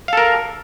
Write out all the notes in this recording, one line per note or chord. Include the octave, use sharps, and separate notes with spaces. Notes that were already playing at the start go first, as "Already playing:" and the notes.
A4 A#4 F5